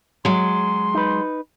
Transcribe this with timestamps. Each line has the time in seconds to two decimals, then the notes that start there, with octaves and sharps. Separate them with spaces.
0.25 F#3 G#3 C6
0.94 D#4 B4